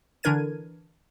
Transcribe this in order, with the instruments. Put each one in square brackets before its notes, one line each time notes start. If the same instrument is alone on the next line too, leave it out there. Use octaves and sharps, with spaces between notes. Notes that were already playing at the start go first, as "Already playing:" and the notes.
[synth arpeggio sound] D3 E3 D4 A#4 G#6 D#7